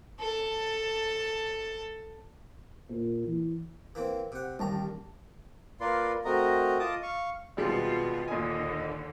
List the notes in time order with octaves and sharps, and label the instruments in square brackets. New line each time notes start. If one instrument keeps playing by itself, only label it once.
[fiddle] A4 A5
[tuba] A#2
E3
[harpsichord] E3 A#3 C4
C3 F#5
[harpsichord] A1 D#2 A#5 [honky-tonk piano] G3 A5
[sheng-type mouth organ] A#3 F4 A#4 B4 D5 C6
A3 C4 F#4 A#4 D#5 A#5
F4 D#5 A5 D6 D#6
F5 C#6
[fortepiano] G#1 G3 G#3 [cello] B2 F4
[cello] D#2 D3 [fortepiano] A#2 G#5 [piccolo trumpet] D#5